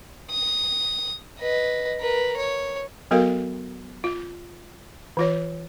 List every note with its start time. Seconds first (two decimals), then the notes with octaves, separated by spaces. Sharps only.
0.31 D#6
1.40 B4 D#5
2.00 A#4 B4
2.37 C#5
3.11 F#3 B3 F#4 A4 A#4 F5
4.04 F4
5.17 E3 F4 C#5